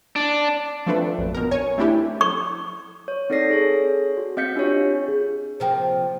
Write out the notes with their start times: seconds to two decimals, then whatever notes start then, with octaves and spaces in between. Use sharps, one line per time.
0.16 D4
0.86 F3 A3 C4 D4 A4 B4
1.18 A#1 F#2
1.34 B2 A#4
1.51 C#5 G#5
1.78 A3 C4 D4 E4 G4
2.21 C#6
3.08 C#5
3.30 C4 D#4 A4 D5 A#6 C7
3.50 G#4 A4 C#5
4.17 F#4
4.37 C4 D#5 F5 G6 B6 C#7
4.56 D4 F4 G4 C#5
5.08 G#4
5.60 C3 F3 A#3 C5 G5